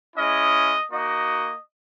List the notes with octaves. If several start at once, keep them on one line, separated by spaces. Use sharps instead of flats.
G#3 C#4 E4 D#5
A#3 D#4 F#4 D#5